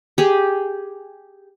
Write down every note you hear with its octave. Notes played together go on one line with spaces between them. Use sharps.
G4 G#4